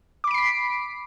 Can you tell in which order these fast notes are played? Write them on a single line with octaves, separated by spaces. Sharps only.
D6 B5 D7 C7 B6